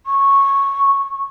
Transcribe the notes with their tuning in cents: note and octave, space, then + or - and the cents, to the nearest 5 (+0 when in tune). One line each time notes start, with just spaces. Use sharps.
C#6 -5